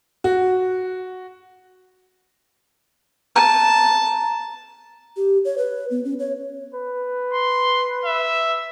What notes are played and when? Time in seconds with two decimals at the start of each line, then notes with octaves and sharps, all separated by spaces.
0.24 F#4
3.36 A5 A#5
5.17 G4
5.45 C#5
5.58 B4
5.91 B3
6.05 C#4
6.19 C#5
6.74 B4
7.33 C6
8.05 E5